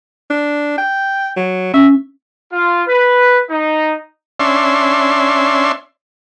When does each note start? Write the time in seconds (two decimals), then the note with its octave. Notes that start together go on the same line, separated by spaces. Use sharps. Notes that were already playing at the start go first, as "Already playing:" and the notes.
0.30 D4
0.78 G5
1.37 F#3
1.74 C#4 E5
2.52 F4
2.87 B4
3.49 D#4
4.40 C#4 D4 E5 C6